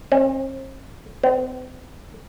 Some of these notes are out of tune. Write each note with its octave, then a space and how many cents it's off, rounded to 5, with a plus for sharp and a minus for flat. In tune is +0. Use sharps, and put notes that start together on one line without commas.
C4 +40
C4 -45